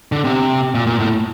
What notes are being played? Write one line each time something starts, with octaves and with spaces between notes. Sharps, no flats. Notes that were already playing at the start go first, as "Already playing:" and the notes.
D3
C3
A#2
A#2
A2